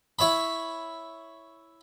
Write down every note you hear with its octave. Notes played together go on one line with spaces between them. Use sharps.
E4 C#5 E5 B5